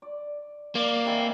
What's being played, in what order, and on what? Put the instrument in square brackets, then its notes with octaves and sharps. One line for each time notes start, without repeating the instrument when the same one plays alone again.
[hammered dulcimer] D5
[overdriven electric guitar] A#3 [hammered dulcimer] D5
[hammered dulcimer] C3 D#3 E3